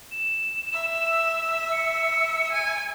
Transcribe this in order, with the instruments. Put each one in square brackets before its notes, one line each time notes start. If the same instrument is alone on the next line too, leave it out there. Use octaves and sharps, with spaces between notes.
[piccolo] E7
[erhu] E5
[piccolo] C#7
[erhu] G#5